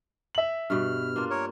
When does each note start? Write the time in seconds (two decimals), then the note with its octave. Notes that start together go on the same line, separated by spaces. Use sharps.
0.35 E5 F#7
0.70 G2 B2 F6
1.16 A#3 D4 F4
1.30 A#4 C#5